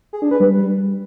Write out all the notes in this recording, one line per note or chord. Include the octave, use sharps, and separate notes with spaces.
G#4
D4
B4
G3